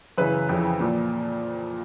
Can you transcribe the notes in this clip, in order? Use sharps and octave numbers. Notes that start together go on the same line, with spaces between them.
F#2 C#3 E3 B4
F2 C#3 E3
A#2 F3